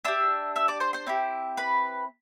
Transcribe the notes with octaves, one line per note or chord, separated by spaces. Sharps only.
D4 G4 E5 E6
E5 E6
D5 D6
C5 C6
C5 C6
C4 E4 G4
B4 B5